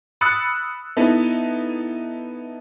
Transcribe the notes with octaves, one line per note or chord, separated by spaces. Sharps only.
B5 D#6 E6 F#6 A6 C#7
B3 D#4 E4 A4